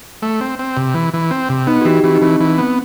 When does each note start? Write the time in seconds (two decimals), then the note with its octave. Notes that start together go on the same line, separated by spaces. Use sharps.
0.22 A3
0.41 C4
0.59 C4
0.77 C3
0.95 E3
1.14 E3
1.31 C4
1.49 C3
1.67 B3 D#4
1.81 F#4
1.85 E3 G4
2.04 E3 C4
2.15 D#4
2.22 E3 C4
2.40 E3
2.58 B3